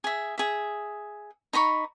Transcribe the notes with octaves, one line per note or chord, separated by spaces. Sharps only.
G#4 E5
G#4 E5
D#4 A#5 B5 C#6